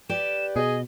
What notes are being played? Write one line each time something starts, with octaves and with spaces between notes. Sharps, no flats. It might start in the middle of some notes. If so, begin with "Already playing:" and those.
G4 B4 D5 E7
B2 G#4 D#5